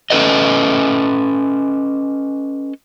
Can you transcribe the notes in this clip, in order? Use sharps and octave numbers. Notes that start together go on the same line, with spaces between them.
C#4 A4 B4 D#5